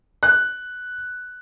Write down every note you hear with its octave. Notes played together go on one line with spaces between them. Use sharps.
F#6